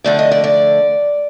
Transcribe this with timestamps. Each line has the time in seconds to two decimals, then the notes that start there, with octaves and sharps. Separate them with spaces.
0.04 D3 F3 A3 D5
0.19 D#5
0.32 D5
0.44 D5